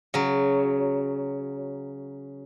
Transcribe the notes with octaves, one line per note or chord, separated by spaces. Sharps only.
C#3 F#3